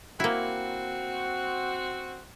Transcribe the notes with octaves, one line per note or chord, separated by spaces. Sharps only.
A#3 C4 E4 F#4